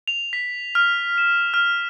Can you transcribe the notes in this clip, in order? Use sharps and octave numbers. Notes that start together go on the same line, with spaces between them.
F7
B6
F6
E7
F6